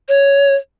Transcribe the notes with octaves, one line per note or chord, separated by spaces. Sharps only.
C#5